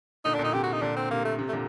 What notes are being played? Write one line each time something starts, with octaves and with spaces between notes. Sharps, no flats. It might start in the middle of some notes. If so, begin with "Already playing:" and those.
A#2 D3 D#4
D4
A#2 D3 D#4
C3 G4
F#4
D#4
A#2 D3 D4
C4
C3 A#3
A3
C3
A3
A#2 D3